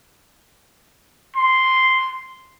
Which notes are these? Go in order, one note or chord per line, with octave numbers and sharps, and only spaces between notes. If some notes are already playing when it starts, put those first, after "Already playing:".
C6